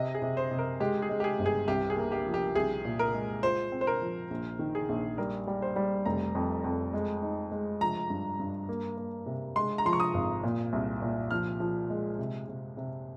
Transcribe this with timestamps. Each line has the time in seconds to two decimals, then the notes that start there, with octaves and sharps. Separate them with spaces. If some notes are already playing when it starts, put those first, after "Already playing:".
Already playing: C3 D#5
0.15 G#4
0.22 C3
0.37 C5
0.51 C3
0.58 A#4
0.80 G#3 G4
1.02 G#4
1.09 G#3
1.20 G4
1.24 G#4
1.39 G1
1.46 G#4
1.68 C2 G4
1.90 G#4
1.97 A#3
2.12 G4
2.26 F3
2.34 G4
2.55 C2 G#4
2.85 A#2
2.99 A#4
3.14 G#3
3.43 F4 C5
3.72 C4
3.81 C5
3.87 A#4
4.02 F3
4.30 A#1
4.59 D#3
4.75 G#4
4.89 A#1
5.18 G3 A#4
5.47 G3
5.62 C5
5.76 G3
6.05 F1 A#5
6.35 F2
6.64 F2
6.93 G#3
7.22 D#4
7.52 G#3
7.81 F3 A#5
8.10 G2
8.40 G2
8.69 A#3
8.98 A#3
9.26 C3
9.56 G#3 C6
9.78 A#5
9.85 F3 C6
9.93 C#6
10.00 D#6
10.14 G#1
10.43 A#2
10.73 C2
11.02 A#2
11.31 F3 F6
11.60 F3
11.90 G#3
12.19 C3
12.48 C3
12.77 C3